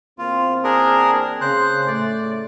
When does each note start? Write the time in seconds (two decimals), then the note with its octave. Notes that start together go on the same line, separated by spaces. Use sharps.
0.18 E2 A#3 C4 F4
0.64 D4 G#4 A#4
1.41 C#3 C5 F#6
1.87 A2 A3 D5